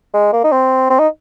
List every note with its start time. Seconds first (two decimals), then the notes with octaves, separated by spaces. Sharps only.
0.14 G#3
0.32 A#3
0.44 D#4
0.52 C4
0.90 C4
0.99 D#4